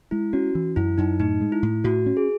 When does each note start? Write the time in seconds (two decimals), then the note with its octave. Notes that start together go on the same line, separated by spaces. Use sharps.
0.11 G#3 E4
0.33 C#4 F#4
0.55 E3
0.76 F#2 E4
0.98 F#2 D#4
1.20 A2 D#4
1.41 G#3
1.52 E4
1.63 A2
1.84 A2 F#4
2.06 C#4
2.17 G#4